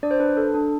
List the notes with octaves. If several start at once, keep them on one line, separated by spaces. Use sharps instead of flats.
D4 D5
C5
D4 B4
A4
D4